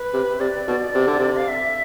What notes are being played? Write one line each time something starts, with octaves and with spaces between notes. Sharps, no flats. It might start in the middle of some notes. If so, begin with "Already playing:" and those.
Already playing: B4
C3
C3 D5
B2
C3
D3
C3
F5
E5